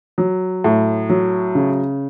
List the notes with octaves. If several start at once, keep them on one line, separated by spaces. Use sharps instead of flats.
F#3
A2
F#3
C#3